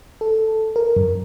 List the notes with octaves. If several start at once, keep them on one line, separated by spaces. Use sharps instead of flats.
A4
A#4
F#2